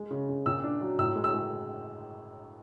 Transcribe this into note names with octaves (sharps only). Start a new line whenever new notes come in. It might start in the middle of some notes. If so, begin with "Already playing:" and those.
Already playing: G#3
C#3
C#3
A#2 E6
D4
F#3
A2 E6
G#3
E6
G#3